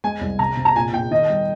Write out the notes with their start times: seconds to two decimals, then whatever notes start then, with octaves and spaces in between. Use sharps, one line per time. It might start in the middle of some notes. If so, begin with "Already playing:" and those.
0.04 G#3 G#5
0.21 C2
0.39 C3 A#5
0.57 C3
0.65 A#5
0.75 A#2 G#5
0.93 A#2 G5
1.11 D#3 D#5
1.30 G3